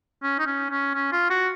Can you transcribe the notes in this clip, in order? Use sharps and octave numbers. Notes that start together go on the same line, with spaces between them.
C#4
D#4
C#4
C#4
C#4
F4
F#4